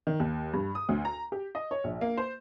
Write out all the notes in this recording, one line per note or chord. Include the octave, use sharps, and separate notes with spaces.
D#3
D#2
G2
D#6
D2
A#5
G4
D#5
C#5
A#1
A#3
C5